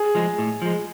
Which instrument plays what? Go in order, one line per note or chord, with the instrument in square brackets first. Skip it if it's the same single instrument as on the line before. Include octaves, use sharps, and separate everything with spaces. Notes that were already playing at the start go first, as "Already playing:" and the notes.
Already playing: [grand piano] G#4
[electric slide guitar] F3 G#3
A2
F3 G#3